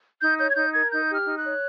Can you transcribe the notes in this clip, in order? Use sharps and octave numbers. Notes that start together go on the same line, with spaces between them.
D#4 G6
C#5 G6
G#6
D#4 G6
A#4 G#6
D#4 G6
G4 F6
D#4
F#6
C#5